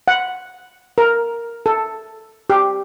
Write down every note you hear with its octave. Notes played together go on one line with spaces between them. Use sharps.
F#5
A#4
A4
G4